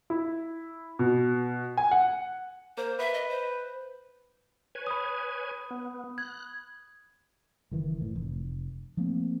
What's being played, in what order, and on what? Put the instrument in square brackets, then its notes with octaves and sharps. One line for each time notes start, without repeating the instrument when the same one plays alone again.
[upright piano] E4
B2
G#5
F#5
[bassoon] A#3 [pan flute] C5
[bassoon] B4 [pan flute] E5
[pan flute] D#5
C5
[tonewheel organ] B4 C#5 G#5
[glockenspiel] B5 D#6
[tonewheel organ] B3
[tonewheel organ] F#6 [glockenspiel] G#6
[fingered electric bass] F#1 D#3 E3
A2 E3
F1
F3 A3 A#3 C4